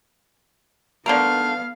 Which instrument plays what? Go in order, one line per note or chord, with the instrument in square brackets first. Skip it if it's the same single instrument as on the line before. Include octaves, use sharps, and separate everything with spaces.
[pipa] D3 A3 A#4 [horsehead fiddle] B3 F5